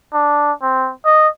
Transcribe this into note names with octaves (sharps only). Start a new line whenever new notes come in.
D4
C4
D#5